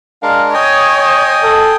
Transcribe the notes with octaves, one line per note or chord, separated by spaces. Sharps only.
G#3 D4 A#4 F5
C#5 D#5 G5 G#5 D#6
A4